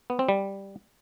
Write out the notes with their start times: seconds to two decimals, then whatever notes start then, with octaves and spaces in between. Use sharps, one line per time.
0.10 B3
0.19 C4
0.29 G3